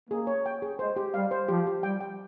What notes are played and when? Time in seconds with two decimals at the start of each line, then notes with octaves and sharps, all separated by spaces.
0.10 A#3 G#4
0.27 C#5
0.46 G5
0.62 G#4
0.79 G#3 C5
0.96 G4
1.14 G3 F5
1.31 C5
1.48 F3 G4
1.67 G4
1.83 G3 G5
2.01 G5